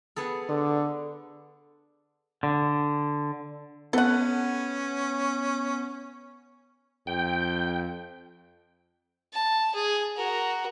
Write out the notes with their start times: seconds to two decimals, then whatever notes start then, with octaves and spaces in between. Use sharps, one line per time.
0.16 B3 G#4 A4
0.49 D3
2.43 D3
3.93 B3 C#4 A4 F#5
7.07 F2 G5
9.33 A5
9.74 G#4
10.16 F#4 A#4